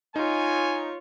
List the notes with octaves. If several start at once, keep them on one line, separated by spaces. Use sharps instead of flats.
D#4 F4 C#5 G#5